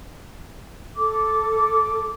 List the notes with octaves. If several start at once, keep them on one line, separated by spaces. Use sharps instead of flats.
A4 D6